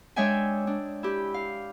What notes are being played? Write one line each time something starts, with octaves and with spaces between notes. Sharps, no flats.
G#3 D4 C#5 E5 G5 G#5
D4
E4 G4
F5